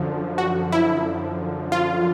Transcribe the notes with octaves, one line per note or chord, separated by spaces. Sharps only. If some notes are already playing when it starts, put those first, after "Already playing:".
Already playing: F#2 D3 F3
F#4
E4
F4